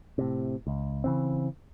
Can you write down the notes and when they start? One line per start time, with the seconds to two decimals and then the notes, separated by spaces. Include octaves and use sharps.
0.18 A2 C3
0.67 C#2
1.04 C#3 E3 C4